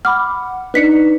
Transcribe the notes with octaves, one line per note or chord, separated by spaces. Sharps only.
F#5 B5 D6 F6
D4 D#4 B4 D5 B6 C#7